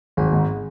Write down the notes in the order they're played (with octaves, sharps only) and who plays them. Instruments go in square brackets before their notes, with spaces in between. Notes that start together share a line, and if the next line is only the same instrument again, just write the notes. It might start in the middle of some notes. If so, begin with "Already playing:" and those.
[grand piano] G#1 [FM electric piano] G#4
[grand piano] G#2